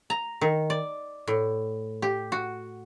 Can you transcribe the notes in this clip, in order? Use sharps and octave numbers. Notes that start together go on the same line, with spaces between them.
A#5
D#3
D5
A2
G4
F#4